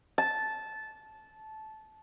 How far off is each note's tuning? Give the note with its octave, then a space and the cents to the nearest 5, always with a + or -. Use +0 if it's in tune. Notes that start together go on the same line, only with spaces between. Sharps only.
A5 -15